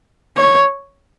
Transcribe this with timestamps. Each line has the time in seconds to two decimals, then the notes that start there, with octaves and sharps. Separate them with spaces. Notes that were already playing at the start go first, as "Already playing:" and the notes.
0.37 C#5